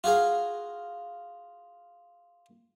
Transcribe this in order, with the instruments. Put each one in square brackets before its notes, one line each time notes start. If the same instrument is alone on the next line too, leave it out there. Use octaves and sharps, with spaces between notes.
[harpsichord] F4 F#4 G#4 A#4 F5